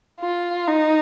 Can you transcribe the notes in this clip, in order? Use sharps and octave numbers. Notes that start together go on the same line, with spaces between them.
F4
D#4